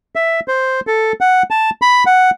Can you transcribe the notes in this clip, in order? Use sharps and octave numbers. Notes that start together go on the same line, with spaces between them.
E5
C5
A4
F#5
A5
B5
F#5